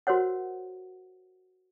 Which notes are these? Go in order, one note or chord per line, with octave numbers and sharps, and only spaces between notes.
F#4 A#4 C5 C#5 F#5